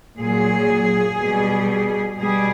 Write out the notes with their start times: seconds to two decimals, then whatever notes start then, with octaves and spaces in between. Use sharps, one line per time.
0.19 A#2 F#3 G#4
1.19 B2 G3
2.18 B2 G3 G#4